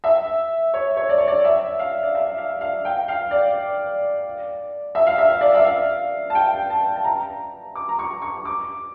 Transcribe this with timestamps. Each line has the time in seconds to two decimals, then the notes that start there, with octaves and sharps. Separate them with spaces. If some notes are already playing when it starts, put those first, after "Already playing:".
0.04 E5
0.74 C#5
0.97 C#5
1.09 D5
1.18 C#5
1.28 D5
1.44 E5
1.79 F5
2.03 D5
2.15 E5
2.38 F5
2.61 F5
2.85 G5
3.08 F5
3.31 D5
4.95 E5
5.07 F5
5.18 E5
5.41 D5
5.55 E5
5.64 F5
6.30 A5
6.35 G5
6.70 A5
6.96 A5
7.05 A#5
7.75 D6
7.89 A#5
7.99 C#6
8.22 C#6
8.45 D6